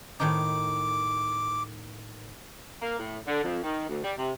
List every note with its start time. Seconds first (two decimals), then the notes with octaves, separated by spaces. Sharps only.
0.20 A2 D#3 D#4 D6
2.82 A#3
2.99 A2
3.27 D3
3.44 F2
3.63 D#3
3.89 D2
4.04 G3
4.17 C3